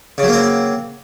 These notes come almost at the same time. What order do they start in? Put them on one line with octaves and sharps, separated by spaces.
C#3 F#3 A#3 C4